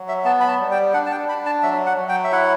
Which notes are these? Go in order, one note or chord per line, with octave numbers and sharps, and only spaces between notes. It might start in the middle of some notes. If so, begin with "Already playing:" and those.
Already playing: F#3
E5
B3 A5
B5
A5
G3
G5
D4 F#5
A5
G5
D4 B5
A5
F#3 E5
F#5
F#3
G5
E5
E4 F#5